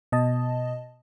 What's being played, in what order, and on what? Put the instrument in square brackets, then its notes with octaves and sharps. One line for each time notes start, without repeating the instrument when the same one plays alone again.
[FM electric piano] B2 D#5 A5